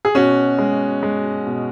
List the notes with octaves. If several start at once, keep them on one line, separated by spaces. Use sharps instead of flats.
G#4
B2 C#4 F#4
G#3
G#3
B2